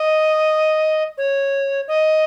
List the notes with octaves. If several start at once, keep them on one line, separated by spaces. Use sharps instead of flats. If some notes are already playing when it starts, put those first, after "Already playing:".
Already playing: D#5
C#5
D#5